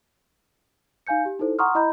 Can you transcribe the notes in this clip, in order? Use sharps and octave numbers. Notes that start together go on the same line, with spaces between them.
D#4 F5 G#5 G6 C#7
G4
D#4 E4 A4 C5
F#5 A#5 C6 C#6 D#6 F6
E4 D#5 A#5 B5 G6